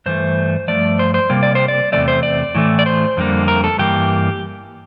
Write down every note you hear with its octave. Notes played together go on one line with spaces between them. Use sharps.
G2 E3 A3 C5
G2 F3 A3 D5
C5
C5
C3 G3 A#3
D5
C5
D5
E2 C3 F3 A3 D5
C5
D5
A2 E3 A3
D5
C5
F2 D3 G3 A#3
A#4
A4
G2 E3 A#3 G4